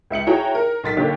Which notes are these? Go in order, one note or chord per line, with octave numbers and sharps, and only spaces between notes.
C#2 E5 C#7 F#7
E4 F#4 G#4 C#5 G5 A#5
A#4
B1 C6 A6 B6
D3 A#3 G4 C#5